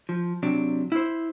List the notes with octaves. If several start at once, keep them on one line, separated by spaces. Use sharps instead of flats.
F3
C3 F#3 D4
E4 C5